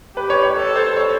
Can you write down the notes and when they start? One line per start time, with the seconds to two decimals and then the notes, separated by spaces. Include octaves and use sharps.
0.16 G4 B4
0.30 C#5
0.43 C#5
0.56 A4
0.76 C5
0.96 C#5